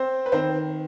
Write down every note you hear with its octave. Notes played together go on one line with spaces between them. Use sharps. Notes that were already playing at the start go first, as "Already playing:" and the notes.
Already playing: C4 C5
B4
D#3 C4 C5